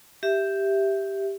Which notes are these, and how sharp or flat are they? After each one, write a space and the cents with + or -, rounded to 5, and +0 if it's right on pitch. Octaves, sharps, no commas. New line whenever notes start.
G4 +0 E5 +0